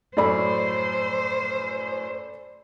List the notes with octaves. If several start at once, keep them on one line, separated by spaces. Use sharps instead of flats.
F#2 A2 A4 C5 D5 B5